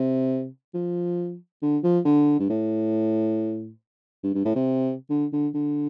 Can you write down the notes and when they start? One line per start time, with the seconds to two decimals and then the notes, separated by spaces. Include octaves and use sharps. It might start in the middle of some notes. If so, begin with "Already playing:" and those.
Already playing: C3
0.74 F3
1.62 D3
1.84 F3
2.05 D3
2.40 G2
2.49 A2
4.24 G2
4.35 G2
4.45 A2
4.56 C3
5.10 D3
5.33 D3
5.55 D3